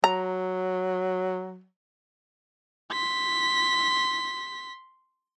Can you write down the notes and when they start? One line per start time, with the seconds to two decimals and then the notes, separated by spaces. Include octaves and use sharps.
0.04 F#3 A#5
2.92 C6 B6